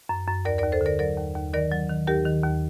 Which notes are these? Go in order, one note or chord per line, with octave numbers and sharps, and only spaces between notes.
F#2
F#2
D#2 A#4 D5
A#4 D5
D#2
A4 C5
D3
A#4 D5
F#3 A#4 D5
D#2
D#2
D#3 A#4 D5
F#3
D#3
D#2 G4 A#4
D#3
D#2